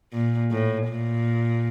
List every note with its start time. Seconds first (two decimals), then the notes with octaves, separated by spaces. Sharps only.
0.13 A#2
0.51 A2
0.89 A#2